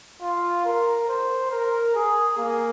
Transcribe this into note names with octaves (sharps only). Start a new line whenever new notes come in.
F4
A#4
C5
A#4
G#4
A#3